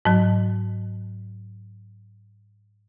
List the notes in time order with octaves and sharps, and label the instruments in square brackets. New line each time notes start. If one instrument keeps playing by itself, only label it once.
[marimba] G#2 F#3